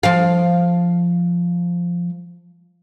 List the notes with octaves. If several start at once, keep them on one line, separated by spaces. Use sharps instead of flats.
F3 F5